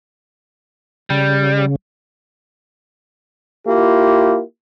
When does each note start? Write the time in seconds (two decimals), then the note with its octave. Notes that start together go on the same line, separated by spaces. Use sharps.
1.10 C#3 G3
3.66 A#3 E4 F4 G4